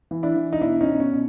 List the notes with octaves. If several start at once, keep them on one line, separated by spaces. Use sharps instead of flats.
E3
D4 E4
E3
D#4
B2 D4 E4
C#4 D#4
B2
C#4
B2